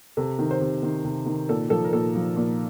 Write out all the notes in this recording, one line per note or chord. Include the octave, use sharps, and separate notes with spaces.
C3 A4
D#3
C5
C3
D#3
C3
D#3
A#2 A4
F3 A4
A#4
A#2 A4
F3
A#2